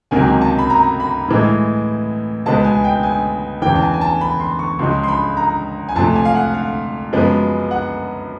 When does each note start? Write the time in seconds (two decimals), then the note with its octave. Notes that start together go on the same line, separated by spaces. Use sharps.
0.11 C#2 C3 D#3 F#3 A#3 G#5
0.41 A5
0.58 B5
0.70 A#5
1.00 B5
1.28 A2 E3 G#3
2.46 C#2 B2 G#3 B3 A5
2.64 G#5
2.84 G5
3.03 G#5
3.62 E2 C#3 E3 G5
3.75 A5
3.82 G#5
3.94 G#5
4.01 A5
4.21 B5
4.40 C6
4.59 C#6
4.79 C#2 C#3 F3 G#3 C6
5.03 C6
5.08 B5
5.37 A#5
5.89 G#5
5.96 F2 C3 F3 A3 A5
6.16 G#5
6.25 F5
6.35 F#5
6.54 F5
7.13 F#2 C#3 F3 G#3 B3
7.71 F#5